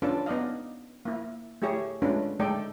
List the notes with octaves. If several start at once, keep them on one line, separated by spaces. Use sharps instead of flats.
C#4 D4 F4 A4 B4 A5
B3 D#4 D5 D#5 F5
A#3 E4
A3 E4 G4 G#4 C#5
G#3 A3 C#4 D4 F4 B4
G#3 A3 D#4 A4 D5 G5